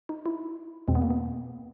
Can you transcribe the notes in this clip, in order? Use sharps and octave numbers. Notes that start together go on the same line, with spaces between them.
D#4
E4
E2 B2 G#3 C4
B3
A#3
B3